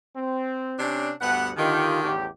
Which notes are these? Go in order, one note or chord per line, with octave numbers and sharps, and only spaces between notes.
C4
C3 C#4 D4
D2 G2 B3 F#5
D3 D#3 F4 G4
A1 E2 G4